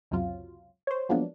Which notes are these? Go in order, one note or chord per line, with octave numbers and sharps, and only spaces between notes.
C#2 F#2 C3 F#3 F4
C5 C#5
F3 F#3 G#3 A#3 B3 D4